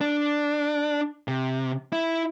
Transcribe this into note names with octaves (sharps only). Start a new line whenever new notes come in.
D4
C3
E4